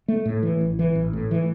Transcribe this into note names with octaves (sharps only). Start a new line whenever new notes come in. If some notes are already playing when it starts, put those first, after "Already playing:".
A3
A2
E3
A1
E3
A1
A2
E3